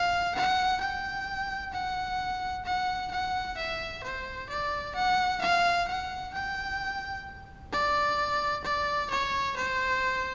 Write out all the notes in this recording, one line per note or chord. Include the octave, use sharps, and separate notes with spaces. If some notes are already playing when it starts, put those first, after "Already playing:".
Already playing: F5
F#5
G5
F#5
F#5
F#5
E5
C5
D5
F#5
F5
F#5
G5
D5
D5
C#5
C5